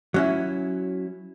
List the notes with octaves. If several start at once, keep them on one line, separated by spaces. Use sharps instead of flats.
F#3 C#4 E4